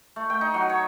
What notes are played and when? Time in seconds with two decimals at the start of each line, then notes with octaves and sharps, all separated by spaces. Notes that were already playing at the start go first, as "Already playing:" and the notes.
0.16 A3
0.30 G5
0.41 D#4
0.54 F#3
0.70 C#5